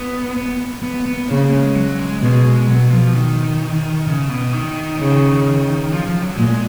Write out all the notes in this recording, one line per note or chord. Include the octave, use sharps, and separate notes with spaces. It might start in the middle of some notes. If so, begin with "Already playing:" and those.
Already playing: B3
B3
B3
B3
C#3 A#3
G#3
F#3
G#3
B2 G#3
B2 F#3
F3
D#3
C#3
B2
D#3
C#3
F3
F3
F#3
A#2 G#3